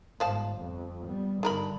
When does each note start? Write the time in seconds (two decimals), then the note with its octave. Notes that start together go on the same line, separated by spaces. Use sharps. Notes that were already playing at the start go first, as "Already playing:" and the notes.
0.20 G1 G#2 F3 F5 A5
0.58 F2
1.08 G3 B3
1.43 G2 D3 D#3 A#4 B5